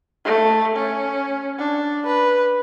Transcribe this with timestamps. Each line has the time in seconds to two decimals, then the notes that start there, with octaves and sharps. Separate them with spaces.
0.25 A3
0.75 C#4
1.58 D4
2.06 B4